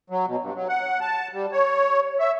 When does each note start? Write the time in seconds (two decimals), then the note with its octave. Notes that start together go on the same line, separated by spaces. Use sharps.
0.10 F#3
0.27 B2
0.41 G2
0.55 F#3
0.68 F#5
1.01 A5
1.33 G3
1.52 C#5
2.20 E5